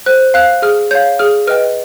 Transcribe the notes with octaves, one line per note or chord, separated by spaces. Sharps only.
C5 F#6
F5 F#6
G#4 F6
C#5 F5 G6
G#4 F6
B4 D#5 G5 F6